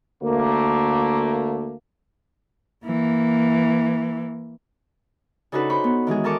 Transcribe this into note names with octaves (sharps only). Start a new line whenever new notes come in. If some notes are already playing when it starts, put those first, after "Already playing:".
D2 A3 A#3
E3 A#3
C#3 D4 D#4 F#4 A4 B4
C5 B5 C#6
B3
D#3 E3 G#3 G#4
A4 A#4 D#5 A5 C#6 D6